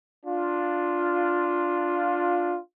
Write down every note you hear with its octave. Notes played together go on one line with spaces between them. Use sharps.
D4 F4